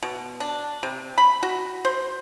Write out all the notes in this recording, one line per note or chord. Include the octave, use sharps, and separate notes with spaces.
B2
D4
C3
B5
F#4
C5